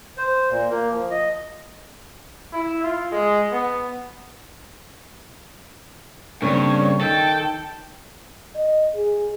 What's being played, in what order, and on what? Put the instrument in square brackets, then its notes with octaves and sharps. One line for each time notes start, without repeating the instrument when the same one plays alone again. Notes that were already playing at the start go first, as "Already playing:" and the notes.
[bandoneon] C5
A#2
A#3
F3
D#5
[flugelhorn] E4
F4
G#3
B3
[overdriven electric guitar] G2 [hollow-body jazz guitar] C#3 A#3 C4 [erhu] C#5
[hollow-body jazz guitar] D#3 [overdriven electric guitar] A4 [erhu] G5
[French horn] D#5
G#4